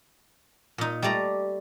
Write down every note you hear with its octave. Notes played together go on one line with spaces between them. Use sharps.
A#2 D#4
G3 A3 D5 A#5